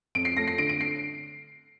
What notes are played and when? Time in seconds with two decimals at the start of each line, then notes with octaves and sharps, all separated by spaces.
0.15 F2 D7
0.25 C7
0.36 A3 A#6
0.48 C7
0.58 D3 D7
0.69 D7
0.80 C7